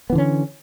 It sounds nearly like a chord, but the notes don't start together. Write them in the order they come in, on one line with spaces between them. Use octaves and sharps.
B3 E3 D3 C#4